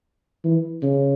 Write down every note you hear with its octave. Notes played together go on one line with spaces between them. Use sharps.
E3
C#3